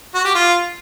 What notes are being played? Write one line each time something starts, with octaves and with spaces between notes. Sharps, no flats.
F#4
G4
F4